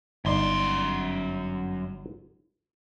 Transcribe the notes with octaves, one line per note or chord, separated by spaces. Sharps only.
G1 F#2 D#4 D5 C6